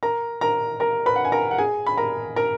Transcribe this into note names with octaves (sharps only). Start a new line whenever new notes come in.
A#4 A#5
A#4 A#5
A#4 A#5
B4 B5
F#5
G#5
A#4 A#5
F#5
G#4 G#5
B5
A#4 A#5
A#4 A#5